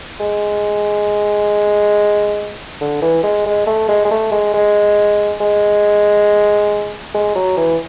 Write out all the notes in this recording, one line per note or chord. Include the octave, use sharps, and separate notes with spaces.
G#3
D3
E3
G#3
G#3
A3
G#3
G#3
A3
G#3
G#3
G#3
G#3
F#3
E3